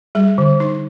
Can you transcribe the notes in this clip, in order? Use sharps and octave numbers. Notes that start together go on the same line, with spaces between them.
G3 G#4
D3
D#4